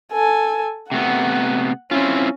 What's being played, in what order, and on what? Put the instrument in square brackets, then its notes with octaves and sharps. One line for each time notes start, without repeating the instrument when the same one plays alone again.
[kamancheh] A4 G#5
[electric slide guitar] C3 A3 B3 [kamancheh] F#5
[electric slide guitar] C4 E4 F4 [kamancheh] C#4